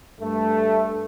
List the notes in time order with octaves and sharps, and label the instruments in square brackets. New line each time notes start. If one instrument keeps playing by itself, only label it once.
[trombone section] G2 A3